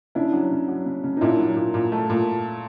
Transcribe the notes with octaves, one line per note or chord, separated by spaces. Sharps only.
C#3 D4 E4
F#3
C#3
F#3
C#3
C#3
D#4
A#2 D4 E4
F#3
A#2
A#2
A3
A#2